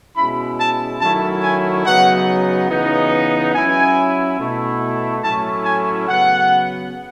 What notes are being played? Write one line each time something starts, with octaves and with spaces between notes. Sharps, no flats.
B2 G#3 C#4 E4 B5
A5
D#3 F#3 A3 C#4 E4 A5
G#5
C#3 F#3 B3 D#4 F#5
C#3 E3 B3 D#4
F#3 C#4 E4 G#5
B2 A3 E4
A2 F#3 A3 C#4 E4 A5
G#5
C#3 F#3 B3 F#5